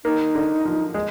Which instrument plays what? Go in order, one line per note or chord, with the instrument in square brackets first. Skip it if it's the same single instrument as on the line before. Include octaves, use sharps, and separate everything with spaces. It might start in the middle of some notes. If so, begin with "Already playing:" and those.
[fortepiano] A#3 [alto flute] D#4
[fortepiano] D3
F3
G#3